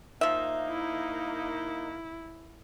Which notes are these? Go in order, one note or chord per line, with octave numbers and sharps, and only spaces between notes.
F3 A#3 D#4 E5
E4